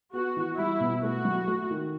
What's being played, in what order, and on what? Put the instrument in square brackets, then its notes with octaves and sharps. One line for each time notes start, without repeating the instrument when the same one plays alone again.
[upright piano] B3 [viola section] F#4
[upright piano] E3
[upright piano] G3 [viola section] E4
[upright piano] B2
[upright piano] A3 [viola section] F#4
[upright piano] F#3
A3
D#3